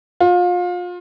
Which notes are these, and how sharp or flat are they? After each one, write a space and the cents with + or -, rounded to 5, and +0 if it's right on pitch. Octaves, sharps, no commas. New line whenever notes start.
F4 +30